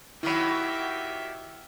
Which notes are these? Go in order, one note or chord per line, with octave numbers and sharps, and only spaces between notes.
D#3 F#3 E4 G4 E5 B5